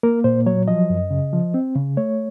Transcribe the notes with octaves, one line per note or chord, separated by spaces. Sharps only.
A#3 A#4
A#2 C5
F#3 C#5
F3 D#5
F#2
C#3
F3
C4
C#3
A3 C#5